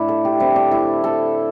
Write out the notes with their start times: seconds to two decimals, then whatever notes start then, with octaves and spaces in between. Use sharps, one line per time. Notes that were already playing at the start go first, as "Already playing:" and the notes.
Already playing: A2 D4 E4
0.09 A4
0.25 G4
0.40 D3 C4 E4
0.56 D4
0.71 E4
1.04 A4